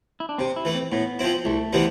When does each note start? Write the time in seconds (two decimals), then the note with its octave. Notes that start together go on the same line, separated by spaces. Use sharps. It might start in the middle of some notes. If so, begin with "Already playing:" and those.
0.20 E4
0.29 D4
0.38 C3 C4
0.56 E4
0.65 E3 A3
0.75 C4
0.92 A2 B3
1.19 F3 C4 E4
1.45 C2 A3
1.73 C3 E3 G3 B3